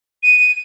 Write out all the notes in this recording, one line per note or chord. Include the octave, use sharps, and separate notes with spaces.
D#7